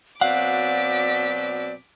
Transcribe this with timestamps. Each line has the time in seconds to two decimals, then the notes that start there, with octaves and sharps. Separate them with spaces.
0.21 B2 F#3 C4 D5 F5 F#5 D6 B6